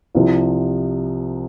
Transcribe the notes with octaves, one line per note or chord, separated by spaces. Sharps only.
C2 C3 F3